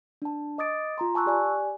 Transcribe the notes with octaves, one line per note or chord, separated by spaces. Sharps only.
D4 A5
D#5 D6 D#6 A6 D7
F4 A#5 C6
G#5 A5 C#6 E6 F#6
G4 D5 G#5